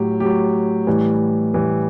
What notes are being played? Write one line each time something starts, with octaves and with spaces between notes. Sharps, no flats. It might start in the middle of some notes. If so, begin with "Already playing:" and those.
Already playing: A2 F#3 G4
A2 F#3 G4
A2 E3 G3
A2 E3 G3